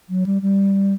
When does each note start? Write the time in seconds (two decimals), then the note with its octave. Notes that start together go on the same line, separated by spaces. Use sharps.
0.10 F#3
0.26 G3
0.42 G3